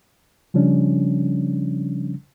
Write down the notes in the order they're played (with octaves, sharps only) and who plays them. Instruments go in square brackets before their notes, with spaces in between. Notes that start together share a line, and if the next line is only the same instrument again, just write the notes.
[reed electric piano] C#3 F3 G3 C#4 D4